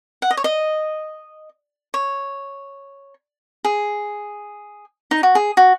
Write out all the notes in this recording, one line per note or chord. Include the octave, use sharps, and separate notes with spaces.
F#5
D#5
C#5
D#5
C#5
G#4
D#4
F#4
G#4
F#4